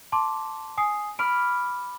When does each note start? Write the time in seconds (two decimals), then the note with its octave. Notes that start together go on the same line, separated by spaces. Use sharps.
0.12 A5 C6 D6
0.78 G#5 D#6 C7
1.19 B5 D6 F6 D7